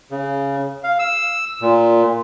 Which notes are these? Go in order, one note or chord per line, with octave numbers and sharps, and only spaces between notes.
C#3
F5
E6
A#2